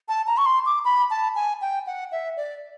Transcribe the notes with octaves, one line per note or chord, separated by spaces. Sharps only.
A5
A#5
C#6
C6
D6
B5
A5
G#5
G5
F#5
E5
D5